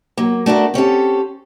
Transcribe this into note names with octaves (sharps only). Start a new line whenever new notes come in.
F#3 A#3
A3 D4 F#4 A#4
C4 C#4 G4 A4